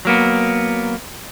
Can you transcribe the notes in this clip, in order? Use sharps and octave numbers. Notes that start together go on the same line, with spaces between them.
F#3 A#3 B3